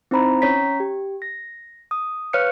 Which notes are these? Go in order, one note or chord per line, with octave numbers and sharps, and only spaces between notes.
C4 D#4 E4 C5 A#5 B5
C#4 C#5 A#5 B6
G4
A#6
D#6
B4 C#5 F5 F6 F#6 C#7